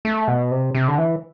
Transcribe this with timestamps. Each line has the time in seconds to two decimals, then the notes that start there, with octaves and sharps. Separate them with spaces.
0.05 A3
0.28 B2
0.51 C3
0.75 C3
0.88 D3
0.98 E3